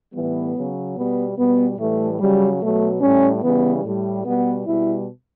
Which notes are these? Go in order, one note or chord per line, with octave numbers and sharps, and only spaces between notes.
A2 E3 G3 B3
C#3 F#3
B2 G3 B3
B2 G3 B3
A2 E3 G3 A3
C#3 F#3 G3
B2 F#3 A3
A2 G3 C#4
C#3 E3 G3 B3
A2 G3
B2 G3 B3
B2 G3 E4